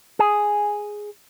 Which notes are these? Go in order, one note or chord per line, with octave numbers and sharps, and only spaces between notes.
G#4